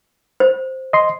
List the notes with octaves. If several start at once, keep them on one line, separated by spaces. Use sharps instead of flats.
C5
D#5 C6